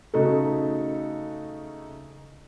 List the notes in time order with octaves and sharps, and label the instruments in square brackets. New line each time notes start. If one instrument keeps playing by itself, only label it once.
[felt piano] C#3 A3 D#4 F#4 A4